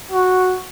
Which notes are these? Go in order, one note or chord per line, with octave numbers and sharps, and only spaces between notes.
F#4